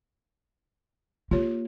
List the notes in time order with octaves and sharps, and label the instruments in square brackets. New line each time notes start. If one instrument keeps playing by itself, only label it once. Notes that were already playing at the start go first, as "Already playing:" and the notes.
[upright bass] A#3 [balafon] F4 G4 C#5